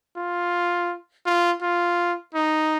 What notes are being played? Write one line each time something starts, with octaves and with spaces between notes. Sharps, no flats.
F4
F4
F4
D#4